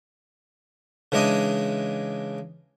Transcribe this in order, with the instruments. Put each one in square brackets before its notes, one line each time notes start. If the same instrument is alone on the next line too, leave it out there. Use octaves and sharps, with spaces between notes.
[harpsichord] C#3 E3 G#3 D4 D#5 D#6